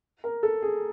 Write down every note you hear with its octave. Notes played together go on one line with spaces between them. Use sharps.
A#4
A4
G#4